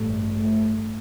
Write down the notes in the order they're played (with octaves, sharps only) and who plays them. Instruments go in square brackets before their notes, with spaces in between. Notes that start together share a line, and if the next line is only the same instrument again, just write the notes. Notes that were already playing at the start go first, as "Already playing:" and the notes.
Already playing: [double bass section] A1 G2 A3
A3